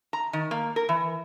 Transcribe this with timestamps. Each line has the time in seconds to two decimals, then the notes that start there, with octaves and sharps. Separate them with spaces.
0.13 A#5
0.33 D#3
0.51 A#3
0.76 A#4
0.89 E3